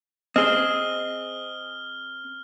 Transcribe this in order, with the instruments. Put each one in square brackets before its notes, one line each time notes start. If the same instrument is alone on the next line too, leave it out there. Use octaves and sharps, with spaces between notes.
[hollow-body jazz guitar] C4 G#4 [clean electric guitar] D#5 [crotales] F6 G7